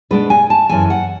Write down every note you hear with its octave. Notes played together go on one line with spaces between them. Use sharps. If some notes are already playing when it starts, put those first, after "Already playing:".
B2 G#3 D4 B4
G#5
A5
F#2 C#3 E3 G#5
F#5